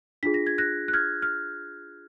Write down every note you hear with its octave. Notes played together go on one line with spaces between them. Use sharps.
D4 F4 G#4 B6
A#6
G#6
F#6 A#6
F#6
F6 G#6
F6